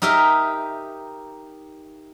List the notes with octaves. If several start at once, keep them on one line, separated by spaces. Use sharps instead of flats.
D#4 G4 A#4 D#5 E5